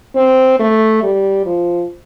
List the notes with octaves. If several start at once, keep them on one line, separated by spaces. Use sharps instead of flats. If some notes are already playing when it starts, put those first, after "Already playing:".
C4
A3
G3
F3